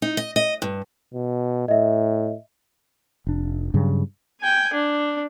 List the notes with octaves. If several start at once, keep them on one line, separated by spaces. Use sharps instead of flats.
D#4
D#5
D#5
G2
B2
A2 D#5 E5
F1 D4
G2 C#3 F#3
G5 G#5
D4